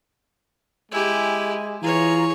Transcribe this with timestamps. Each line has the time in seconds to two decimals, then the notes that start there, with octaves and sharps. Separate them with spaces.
0.92 G#3 E4 G4 G#5
1.83 E3 F4 G#4 C#5 A#5